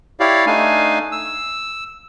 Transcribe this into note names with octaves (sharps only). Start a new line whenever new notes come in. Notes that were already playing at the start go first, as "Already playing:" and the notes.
E4 G4 C#5 D5 F5
A3 D4 D#4 F5 G#5
E6